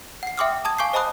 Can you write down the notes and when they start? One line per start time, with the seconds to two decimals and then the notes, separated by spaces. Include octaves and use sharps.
0.23 F#5 C7
0.37 E5 G5 C6 D6 D#6 F6
0.65 A5 D#6 G#6
0.78 F5 G#5 C#6 D6 G6 C7
0.93 C5 D#5 A5 B5 D#6 F#6